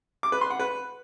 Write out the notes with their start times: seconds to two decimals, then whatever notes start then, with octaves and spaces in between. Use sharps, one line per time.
0.23 D6
0.32 B4
0.41 C6
0.50 F#5
0.60 B4